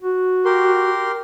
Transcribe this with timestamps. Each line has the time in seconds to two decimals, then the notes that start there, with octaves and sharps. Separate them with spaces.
0.02 F#4
0.45 G4 A#4 C6